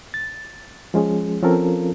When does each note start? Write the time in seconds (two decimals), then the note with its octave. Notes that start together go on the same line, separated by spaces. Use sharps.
0.14 A6
0.94 F3 G#3 C#4 G#4
1.43 F3 C4 C#4 F4 A4 A#4